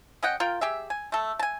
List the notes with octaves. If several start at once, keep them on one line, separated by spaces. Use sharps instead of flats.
C#4 D#5 F#5 G5
F4 A#4 G5
G4 G#4 E5
G#5
A3 A4
G#5 A5